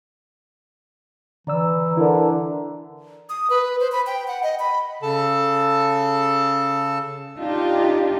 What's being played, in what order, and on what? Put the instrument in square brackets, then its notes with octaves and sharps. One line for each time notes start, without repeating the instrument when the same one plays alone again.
[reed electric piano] D3 D5 E6 [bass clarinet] E3 [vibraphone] A#5
[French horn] D3 [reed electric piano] E4 A#4 D5
[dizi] D#6
B4
C5
B5
G5
F#5
D#5
B5
[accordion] C#3 A4 A5
[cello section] D4 D#4 F4 G4